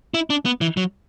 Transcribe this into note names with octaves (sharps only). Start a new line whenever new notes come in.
E4
D4
B3
E3
F#3